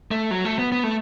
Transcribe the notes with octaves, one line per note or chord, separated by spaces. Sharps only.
A3
F#3
A3
B3
B3
A3